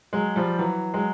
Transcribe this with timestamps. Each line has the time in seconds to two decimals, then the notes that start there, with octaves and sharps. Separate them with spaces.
0.13 F#3 G#3
0.36 F3 G3
0.58 E3 F#3
0.94 F#3 G#3